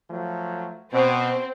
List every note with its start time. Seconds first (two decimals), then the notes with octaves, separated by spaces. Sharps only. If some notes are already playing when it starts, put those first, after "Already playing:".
0.10 F3 F#3 A3
0.93 B2 C4